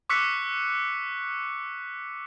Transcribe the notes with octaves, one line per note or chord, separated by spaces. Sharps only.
C#6 D6 E6 F#6 B6 C#7